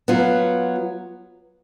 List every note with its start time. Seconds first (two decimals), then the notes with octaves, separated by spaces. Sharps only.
0.08 F#3 B3 F4